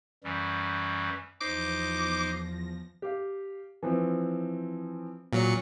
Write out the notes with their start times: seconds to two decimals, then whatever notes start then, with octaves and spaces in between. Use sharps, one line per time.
0.24 F#2 E3 G3
1.41 E2 F3 D#4 C5 D6 A#6
3.02 G4 F5
3.83 E3 F3 C4
5.33 A#2 F#3 C#7